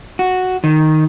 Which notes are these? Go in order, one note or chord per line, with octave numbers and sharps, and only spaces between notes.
F#4
D#3